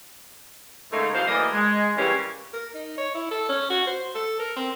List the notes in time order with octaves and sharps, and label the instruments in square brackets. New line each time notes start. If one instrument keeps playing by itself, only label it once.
[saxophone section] G#2 C#3 A3 A#3 D#4
E2 F#3 C5 F5
E3 A3 A#3 D5 D#5
G#3
C#3 E3 G3 A#3 C#4 G4
[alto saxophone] A#4
D#4
C#5
E4
A4
C#4
F#4
C5
A4
A#4
C4